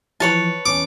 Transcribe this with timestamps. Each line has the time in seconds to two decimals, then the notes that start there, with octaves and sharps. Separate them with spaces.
0.20 E3 F3 B4 C#5 A5
0.66 E2 C#4 D6